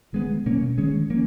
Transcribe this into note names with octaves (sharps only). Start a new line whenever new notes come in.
D#3 G#3 B3
B2 F#3 A#3 C#4
D#3 G#3 C#4
F3 A#3 C#4